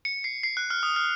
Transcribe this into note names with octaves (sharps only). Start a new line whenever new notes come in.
C#7
C7
C7
F#6
F6
D#6
F6